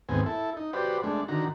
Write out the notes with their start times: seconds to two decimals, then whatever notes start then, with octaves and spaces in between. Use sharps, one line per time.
0.09 D#2 G#2 B3 C4 G#5
0.26 E4 A4
0.57 D#4
0.73 F#4 G4 B4 C5 D5
1.03 G#3 A3 D4
1.28 D3 D#3 F#4 A#5